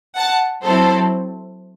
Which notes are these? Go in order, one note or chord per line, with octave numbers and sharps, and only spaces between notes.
F#5 A5
F#3 C4 E4 A4 C5